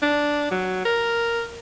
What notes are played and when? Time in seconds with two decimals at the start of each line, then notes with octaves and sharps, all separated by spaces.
0.02 D4
0.51 F#3
0.85 A#4